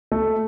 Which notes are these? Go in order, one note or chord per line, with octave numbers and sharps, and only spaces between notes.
A3